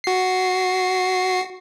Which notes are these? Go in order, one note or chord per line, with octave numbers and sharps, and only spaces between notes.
F#4 C7